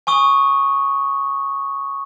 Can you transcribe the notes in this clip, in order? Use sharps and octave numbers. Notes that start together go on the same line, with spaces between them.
G#5 C#6 D#6 G7